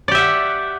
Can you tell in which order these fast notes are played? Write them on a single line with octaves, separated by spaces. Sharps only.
D5 G4 E5 F#5